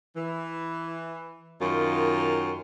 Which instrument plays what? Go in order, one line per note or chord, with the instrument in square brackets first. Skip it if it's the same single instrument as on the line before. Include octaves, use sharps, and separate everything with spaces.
[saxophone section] E3
[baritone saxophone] F#2 [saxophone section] D#3 F4